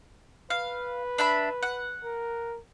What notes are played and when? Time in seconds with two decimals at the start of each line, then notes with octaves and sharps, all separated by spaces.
0.50 B4 F5
1.18 D4 E5 B5
1.62 F#5
2.04 A#4